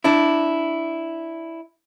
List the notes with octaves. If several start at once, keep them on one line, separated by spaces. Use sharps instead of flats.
D4 E4